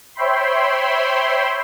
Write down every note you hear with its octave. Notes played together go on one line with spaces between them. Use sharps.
C5 C#5 E5 G5 B5 C6